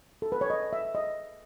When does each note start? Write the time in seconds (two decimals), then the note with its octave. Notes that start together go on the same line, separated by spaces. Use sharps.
0.22 A4
0.32 B4
0.41 C#5
0.50 D#5
0.73 E5
0.95 D#5